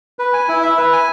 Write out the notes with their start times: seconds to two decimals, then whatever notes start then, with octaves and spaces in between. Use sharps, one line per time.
0.19 B4
0.33 G#5
0.49 E4
0.63 E5
0.78 B4
0.93 G#5